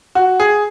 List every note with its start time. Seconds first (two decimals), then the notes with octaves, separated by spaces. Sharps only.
0.15 F#4
0.40 G#4